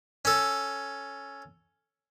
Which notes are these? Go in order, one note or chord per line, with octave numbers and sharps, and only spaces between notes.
C#4 A4